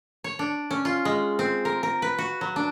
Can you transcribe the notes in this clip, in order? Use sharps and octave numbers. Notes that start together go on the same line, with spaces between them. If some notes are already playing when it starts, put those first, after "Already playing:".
C#5
D4
C#4
F4
G#3
C4
A#4
A#4
B4
F#4
F#3
D4